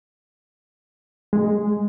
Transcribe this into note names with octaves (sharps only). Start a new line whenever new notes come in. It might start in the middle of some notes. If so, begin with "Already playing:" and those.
G#3